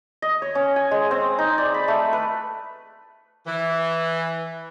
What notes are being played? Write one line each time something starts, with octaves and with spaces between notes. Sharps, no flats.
D#5
C#5
C#4
G#5
G#3
C4
D#4
D5
B5
A3
B4
E3